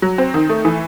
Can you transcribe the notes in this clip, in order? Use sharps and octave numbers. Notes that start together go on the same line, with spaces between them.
F#3
C4
D#3
A3
E3